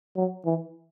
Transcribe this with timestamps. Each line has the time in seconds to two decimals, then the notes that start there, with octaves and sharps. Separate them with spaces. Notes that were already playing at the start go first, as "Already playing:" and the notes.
0.16 F#3
0.45 E3